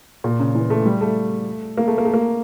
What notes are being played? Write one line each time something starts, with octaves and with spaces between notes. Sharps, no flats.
A#2
C#3
E3
A3
G3
A3
A#3
A3
A#3
A3
A#3